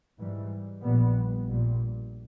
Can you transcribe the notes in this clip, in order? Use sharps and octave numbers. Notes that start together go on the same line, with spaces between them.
G#2 E3 G3
A#1 A#2 G3 B3
A#1 A#2 G3